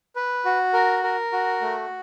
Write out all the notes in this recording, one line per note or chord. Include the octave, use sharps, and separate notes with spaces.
B4
F#4
A#4
A#4
F#4
A3